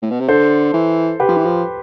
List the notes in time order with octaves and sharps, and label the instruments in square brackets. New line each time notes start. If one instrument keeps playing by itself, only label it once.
[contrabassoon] A2
B2
C3
[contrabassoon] D3 [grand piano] A4 C5
[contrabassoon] E3
[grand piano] G4 B4
[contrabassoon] F3
E3
F3